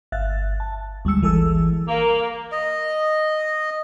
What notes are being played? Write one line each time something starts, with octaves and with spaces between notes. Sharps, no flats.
G1 E5 F5 F#6 A6
A5
D2 G3 G#3 E6 C#7
G#1 E3 G#4 A4 E6
A#3
D#5